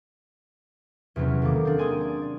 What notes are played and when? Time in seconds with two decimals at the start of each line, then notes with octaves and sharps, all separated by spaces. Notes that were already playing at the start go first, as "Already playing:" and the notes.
1.16 E2 C3 F#3 B3 C#4
1.42 D#3 A#3 A4 D6
1.65 C4 D4
1.78 G#4 D5 G#5 C6 D#6
2.01 D5
2.22 D5